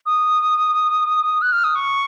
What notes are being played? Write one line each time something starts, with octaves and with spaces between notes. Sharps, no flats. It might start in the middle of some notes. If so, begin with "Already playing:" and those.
D#6
F#6
F6
D#6
C#6